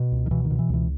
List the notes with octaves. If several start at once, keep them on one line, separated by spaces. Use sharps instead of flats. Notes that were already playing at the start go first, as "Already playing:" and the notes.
Already playing: B2
C#2
D#3
B2 E3
D#3
B2
E3
C#2 E3